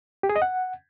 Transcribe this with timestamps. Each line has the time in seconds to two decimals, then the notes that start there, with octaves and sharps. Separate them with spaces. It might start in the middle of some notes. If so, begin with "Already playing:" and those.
0.23 G4
0.29 G#4
0.36 D#5
0.42 F#5